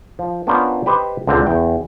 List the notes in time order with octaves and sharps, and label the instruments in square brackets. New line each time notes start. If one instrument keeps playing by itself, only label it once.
[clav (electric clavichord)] F3
B3 C#4 D4 F4 A#4 C5
G4 B4 C5 D#5
C#2 A#2 D3 C4
E2 G5